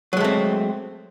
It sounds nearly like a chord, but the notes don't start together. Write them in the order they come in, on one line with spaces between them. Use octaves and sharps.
F#3 G#3 A3 C4